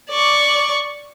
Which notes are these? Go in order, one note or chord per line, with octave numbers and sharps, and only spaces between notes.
D5 C#6